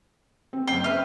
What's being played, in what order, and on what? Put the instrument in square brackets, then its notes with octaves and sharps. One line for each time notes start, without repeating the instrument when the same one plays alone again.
[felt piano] C4
[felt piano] F#1 C7 [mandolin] G5
[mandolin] B4 F6 [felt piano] E5